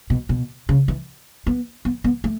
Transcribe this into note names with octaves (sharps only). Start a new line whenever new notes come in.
B2
B2
C#3
E3
B3
B3
B3
A3